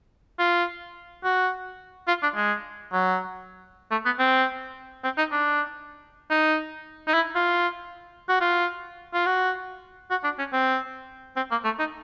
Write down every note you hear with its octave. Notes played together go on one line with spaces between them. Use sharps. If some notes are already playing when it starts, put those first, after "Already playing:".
F4
F#4
F4
D4
G#3
F#3
A3
B3
C4
C4
D#4
D4
D#4
D#4
E4
F4
F#4
F4
F4
F#4
F#4
D4
C#4
C4
C4
A#3
A3
D#4